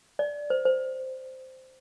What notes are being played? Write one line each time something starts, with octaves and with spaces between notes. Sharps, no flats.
D5
C5
C5